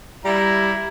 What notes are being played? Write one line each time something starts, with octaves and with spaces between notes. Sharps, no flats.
G3 E4 A#5